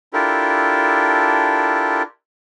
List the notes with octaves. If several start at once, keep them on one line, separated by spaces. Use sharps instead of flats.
D4 E4 F4 G4 A4 A#4